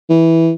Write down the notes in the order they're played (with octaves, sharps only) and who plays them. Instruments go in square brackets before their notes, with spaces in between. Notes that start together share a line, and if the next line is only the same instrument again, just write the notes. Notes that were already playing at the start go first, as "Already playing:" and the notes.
[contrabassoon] E3